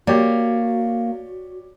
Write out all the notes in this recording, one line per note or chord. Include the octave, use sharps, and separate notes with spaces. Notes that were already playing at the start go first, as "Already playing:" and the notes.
A#3 F#4 G4 C#5 D5